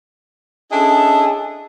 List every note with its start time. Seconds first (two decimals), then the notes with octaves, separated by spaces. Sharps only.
0.72 C#4 D4 E4 G#4 A4 D#5